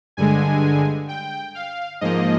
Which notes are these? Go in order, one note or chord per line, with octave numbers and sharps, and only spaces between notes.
G2 D3 G#3 G#5
G5
F5
G#2 F3 A#3 D#5